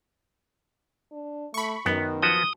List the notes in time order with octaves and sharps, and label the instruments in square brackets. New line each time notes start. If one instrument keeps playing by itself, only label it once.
[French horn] D4
[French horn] A3 [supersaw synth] B5 C#6
[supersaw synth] F#2 [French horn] D#3 [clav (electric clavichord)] B3
[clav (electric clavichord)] F3 B3 F#4 [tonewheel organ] D#6